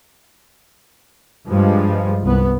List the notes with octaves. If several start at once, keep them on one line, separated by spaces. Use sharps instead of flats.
G2 F3 G3 G#3
C2 B3